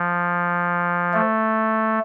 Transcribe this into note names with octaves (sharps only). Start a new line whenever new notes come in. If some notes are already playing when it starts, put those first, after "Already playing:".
Already playing: F3
A3